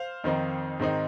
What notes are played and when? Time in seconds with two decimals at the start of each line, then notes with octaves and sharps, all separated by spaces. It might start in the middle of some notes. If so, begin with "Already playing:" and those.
Already playing: C5 F5
0.24 F2 D#3 C4 D#4
0.79 G#2 D#3 C4 D#4